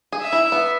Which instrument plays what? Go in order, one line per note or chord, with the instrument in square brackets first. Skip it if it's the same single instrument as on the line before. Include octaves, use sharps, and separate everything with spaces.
[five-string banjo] G#4
[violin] E5
[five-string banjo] E4
B3